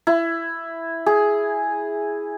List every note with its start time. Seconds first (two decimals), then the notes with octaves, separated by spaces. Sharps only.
0.07 E4
1.06 G#4